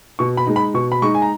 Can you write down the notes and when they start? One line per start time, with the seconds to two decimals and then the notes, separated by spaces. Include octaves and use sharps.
0.19 B2 C#6
0.37 B5
0.47 G#3 D#4
0.56 B5
0.74 B2 C#6
0.92 B5
1.02 G#3 D#4 C#6
1.15 G#5
1.22 A#5